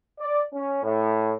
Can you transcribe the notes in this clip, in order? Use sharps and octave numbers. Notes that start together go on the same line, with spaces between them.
D5
C#4
A2